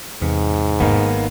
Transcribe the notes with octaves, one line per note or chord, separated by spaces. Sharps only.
E2 G#2 C3
G#1 D#3 A#3 B3